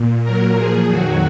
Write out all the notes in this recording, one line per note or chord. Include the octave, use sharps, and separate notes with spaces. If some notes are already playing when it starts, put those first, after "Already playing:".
Already playing: A#2
A#2 F#3 A#4
A#2 F3 G#4
F2 D#3 F#3 F#4